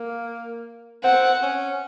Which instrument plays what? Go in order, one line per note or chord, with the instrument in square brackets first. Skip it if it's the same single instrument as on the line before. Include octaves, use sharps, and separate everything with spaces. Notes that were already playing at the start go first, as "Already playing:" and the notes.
Already playing: [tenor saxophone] A#3
[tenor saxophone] C4 [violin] F#5
[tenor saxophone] C#4